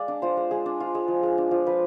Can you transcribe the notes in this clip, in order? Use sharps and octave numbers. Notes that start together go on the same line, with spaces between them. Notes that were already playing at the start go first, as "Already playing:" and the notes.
Already playing: G#3 D5 F5
D4
F4 C5
G#3
G#3 G#4
D4
F4
G#3
F3
G#3
D4
F3
F3 B4